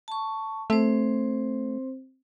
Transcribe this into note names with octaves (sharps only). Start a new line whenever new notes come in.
A5 C#6
A3 C4 C5